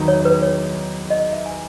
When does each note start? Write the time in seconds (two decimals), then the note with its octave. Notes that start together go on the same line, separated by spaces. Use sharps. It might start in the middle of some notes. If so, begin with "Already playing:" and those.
Already playing: E2 D#3 F#3 B3 D#4
0.08 C#5
0.25 B4
0.42 C#5
1.10 D#5
1.33 E5
1.46 G#5